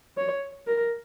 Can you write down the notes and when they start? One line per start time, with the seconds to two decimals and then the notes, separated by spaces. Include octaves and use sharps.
0.17 C#5
0.67 A#4